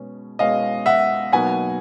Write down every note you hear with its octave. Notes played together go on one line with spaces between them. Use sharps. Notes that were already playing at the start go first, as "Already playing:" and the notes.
Already playing: B2 G#3 C#4
B2 G#3 C#4 D#5 F5
E5 F#5
B2 F#3 A#3 D#4 F#5 G#5